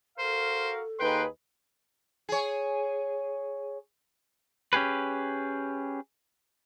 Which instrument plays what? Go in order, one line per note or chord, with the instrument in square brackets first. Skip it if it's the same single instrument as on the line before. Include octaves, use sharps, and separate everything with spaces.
[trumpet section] F#4 A#4 F5 [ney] A4 [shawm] C5
[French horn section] D#2 D#4 B4 [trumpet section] G#4 C6 [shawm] G5
[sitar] G#4 C#5
[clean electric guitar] C#4 G4 G#4 B4